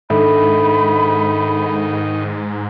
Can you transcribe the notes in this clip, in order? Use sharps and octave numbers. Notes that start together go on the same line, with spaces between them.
G#2 D#3 D4 A4 E5 B5